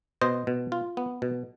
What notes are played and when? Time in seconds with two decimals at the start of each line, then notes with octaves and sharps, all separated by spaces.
0.21 B2 C5 D#5
0.47 B2
0.72 F4
0.97 B3
1.22 B2